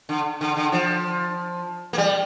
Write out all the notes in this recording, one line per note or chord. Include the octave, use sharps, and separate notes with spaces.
D3
D3
D3
F3
A#3
G3